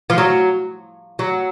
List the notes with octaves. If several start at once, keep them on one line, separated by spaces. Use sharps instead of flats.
F3
F#3
F#3